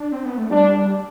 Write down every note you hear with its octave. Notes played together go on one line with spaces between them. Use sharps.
D4
C4
B3
A3
G3 D4
G3